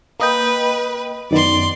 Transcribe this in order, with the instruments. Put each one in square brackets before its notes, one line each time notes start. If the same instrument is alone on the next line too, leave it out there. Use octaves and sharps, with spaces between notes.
[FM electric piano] A#3 D#5 G5 [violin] B4
[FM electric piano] F#2 D#3 B3 [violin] D5 C6